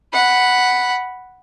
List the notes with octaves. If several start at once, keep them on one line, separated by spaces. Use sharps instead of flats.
F#5 B5